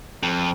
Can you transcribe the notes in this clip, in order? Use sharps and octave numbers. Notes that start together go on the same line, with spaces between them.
F2